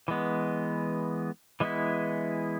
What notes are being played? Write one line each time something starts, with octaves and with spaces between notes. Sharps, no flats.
E3 G#3 B3
E3 G#3 B3 E4